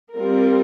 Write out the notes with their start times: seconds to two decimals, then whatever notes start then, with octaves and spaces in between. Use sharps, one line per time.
0.14 G3 C4 F4 A#4